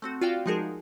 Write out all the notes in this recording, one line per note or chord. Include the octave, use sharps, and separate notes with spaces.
A3 C4 F#4
F4 F#4 D5 F5 G5
F3 G#3 D#4 F#4 G#4 A#4